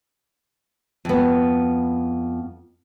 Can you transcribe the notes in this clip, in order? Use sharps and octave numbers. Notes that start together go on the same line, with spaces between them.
F2 B3